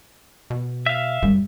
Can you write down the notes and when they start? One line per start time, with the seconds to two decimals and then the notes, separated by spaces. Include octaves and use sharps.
0.50 B2
0.86 E5 F5
1.23 F#2 G3